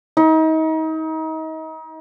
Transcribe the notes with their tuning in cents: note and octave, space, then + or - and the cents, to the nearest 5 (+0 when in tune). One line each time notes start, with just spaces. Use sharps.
D#4 +35